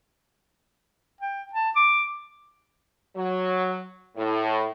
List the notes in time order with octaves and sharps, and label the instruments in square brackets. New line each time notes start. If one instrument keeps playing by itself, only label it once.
[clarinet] G5
A5
D6
[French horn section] F#3
A2